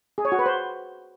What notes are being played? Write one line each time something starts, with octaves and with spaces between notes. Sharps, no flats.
G#4
C#5
F#4
B4
C5